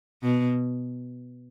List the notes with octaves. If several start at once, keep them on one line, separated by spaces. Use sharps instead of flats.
B2